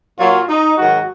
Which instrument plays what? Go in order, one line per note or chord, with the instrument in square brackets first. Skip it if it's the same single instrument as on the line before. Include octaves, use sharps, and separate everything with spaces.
[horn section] A#2 F#3 F4
D#4
G#2 D#3 F#3 F#4